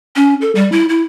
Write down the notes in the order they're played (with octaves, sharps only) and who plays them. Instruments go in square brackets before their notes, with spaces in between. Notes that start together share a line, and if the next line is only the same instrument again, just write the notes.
[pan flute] C#4
A4
G3
E4
E4